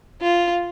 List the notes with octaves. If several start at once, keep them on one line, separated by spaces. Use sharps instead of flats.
F4